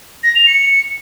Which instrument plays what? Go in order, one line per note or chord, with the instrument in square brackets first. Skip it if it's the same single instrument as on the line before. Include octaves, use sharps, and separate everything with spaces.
[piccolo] A#6
F7
C#7